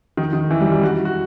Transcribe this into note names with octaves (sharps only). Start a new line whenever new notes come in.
D#3
D#3
E3
G3
G3
F#4
F#4